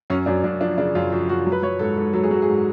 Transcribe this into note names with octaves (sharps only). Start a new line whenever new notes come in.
F#2 C#4
F#2 D4
F#2 D4
F3 D4
C#3 D4
F#2 F4
F3 F#4
F#2 F#4
F#3
B4
F#3 C#5
G#2 A4
G#2 A4
F#3 A4
G#4
F#3 F#4
G#4
G#2